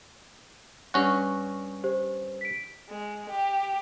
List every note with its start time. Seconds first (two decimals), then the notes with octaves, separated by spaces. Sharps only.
0.94 G2 C#4 F#5 C#6 A#6
1.84 G4 C5
2.41 B6 D7
2.87 G#3
3.29 G4